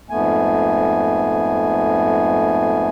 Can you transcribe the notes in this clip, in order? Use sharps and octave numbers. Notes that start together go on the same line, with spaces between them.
F2 G#2 A3 B3 G#5